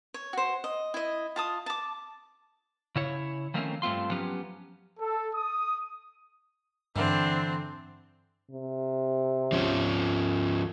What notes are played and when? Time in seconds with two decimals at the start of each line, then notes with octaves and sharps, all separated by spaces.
0.14 C#5
0.33 F#4 C5
0.64 D#5
0.94 E4 D#5
1.36 F4 A5 D#6
1.66 A5 D6
2.96 C#3 E4 C#5
3.54 D#3 F3 A3 A#3 C4 C#4
3.82 G2 A3 C4 F4 C6
4.11 F3 F#3 B3 C#4 G4
5.00 A4
5.33 D#6
6.96 G2 D3 E3 C4 D4
8.52 C3
9.52 F3 C#4